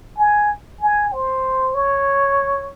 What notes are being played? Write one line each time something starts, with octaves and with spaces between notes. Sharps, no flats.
G#5
G#5
C5
C#5